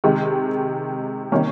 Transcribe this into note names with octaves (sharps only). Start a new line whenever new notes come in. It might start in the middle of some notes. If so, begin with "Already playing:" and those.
C3 D#3 G#3
C3 D#3 G3 A#3 C#4